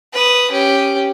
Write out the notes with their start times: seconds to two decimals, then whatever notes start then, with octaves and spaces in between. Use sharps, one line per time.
0.13 B4 D#6
0.51 C#4 G4